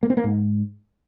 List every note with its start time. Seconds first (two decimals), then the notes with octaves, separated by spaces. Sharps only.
0.03 A#3
0.10 C4
0.17 A#3
0.24 G#2